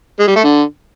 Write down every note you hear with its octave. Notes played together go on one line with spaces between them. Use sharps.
G#3
G3
A3
D3